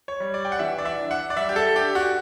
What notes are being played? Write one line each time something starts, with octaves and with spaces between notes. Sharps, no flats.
C#5
G3
D5
G5
F#5
E3 E5
D5
E5
D4
F#5
D5
G3 E5
G4
A4
D4 G4
F#4